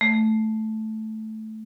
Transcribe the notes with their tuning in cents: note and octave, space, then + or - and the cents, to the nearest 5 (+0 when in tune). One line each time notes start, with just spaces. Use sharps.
A3 -10